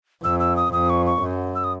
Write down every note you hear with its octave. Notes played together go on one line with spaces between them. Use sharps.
F2 E6
E6
D#6
F2 D#6
C#6
C#6
F#2
E6
D#6